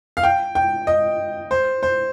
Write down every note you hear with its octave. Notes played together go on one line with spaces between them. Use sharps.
F5
G5
G5
D#5
C5
C5